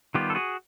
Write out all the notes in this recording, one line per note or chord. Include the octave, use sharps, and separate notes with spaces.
D#3 G3 B3 F4 G4
A4
F#4 G#4